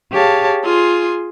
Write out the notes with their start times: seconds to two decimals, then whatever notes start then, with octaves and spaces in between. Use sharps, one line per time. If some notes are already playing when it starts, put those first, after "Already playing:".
0.12 G4 G#4 C#5 F5 A5
0.63 F4 G#4 C6